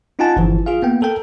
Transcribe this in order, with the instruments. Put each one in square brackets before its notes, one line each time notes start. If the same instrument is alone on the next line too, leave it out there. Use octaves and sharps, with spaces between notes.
[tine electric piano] C#4 D#4 F4 F#5 G#5 A5
G1 E3 F3
F4 G#4 F5
A#3 B3 G5
A4 A#4 G5